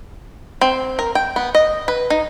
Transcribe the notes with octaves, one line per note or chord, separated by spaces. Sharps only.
C4
A#4
G5
B3
D#5
B4
D#4